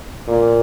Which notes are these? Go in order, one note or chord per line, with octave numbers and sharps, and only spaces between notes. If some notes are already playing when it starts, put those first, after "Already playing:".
A#2